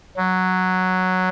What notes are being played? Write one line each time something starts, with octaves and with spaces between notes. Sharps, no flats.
F#3